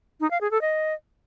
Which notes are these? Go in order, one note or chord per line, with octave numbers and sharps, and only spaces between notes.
D#4
F5
G#4
A4
D#5